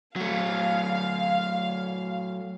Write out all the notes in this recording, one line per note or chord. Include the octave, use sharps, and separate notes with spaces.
F#3 A3 F5